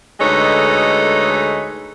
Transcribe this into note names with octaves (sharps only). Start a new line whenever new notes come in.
D2 G#3 D#4 A4 B4 C#5